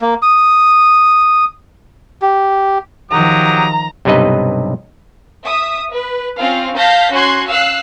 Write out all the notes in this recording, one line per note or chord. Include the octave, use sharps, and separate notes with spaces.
A#3
D#6
G4
D#3 F3 F#3 G4 A#5 D#6
B1 G2 C3 D#4 B4 D#5
E5 D#6
B4
C4 C#4 F4 F5
F5 A5 G6 A#6 B6
C#4 F#4 C6 F#6 G#6
F5 E6 F#6 C7